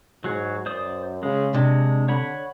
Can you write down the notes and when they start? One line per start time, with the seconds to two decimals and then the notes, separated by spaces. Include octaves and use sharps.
0.24 G#2 F#3 F#4 G#4
0.66 F#2 C5 D5 D#6
1.23 C#3 G#3
1.54 C3 G#3 D4
2.08 D3 C#5 F#5 B5